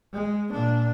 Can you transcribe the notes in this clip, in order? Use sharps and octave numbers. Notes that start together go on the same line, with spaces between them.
G#3
A#2 D4